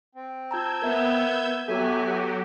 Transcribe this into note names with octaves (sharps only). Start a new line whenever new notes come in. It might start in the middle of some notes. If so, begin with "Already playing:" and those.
C4
F4 A5 A#5 E6 G6 G#6
B3 A#4 E5
F#3 B3 F#4 G4 A4 E5 G#5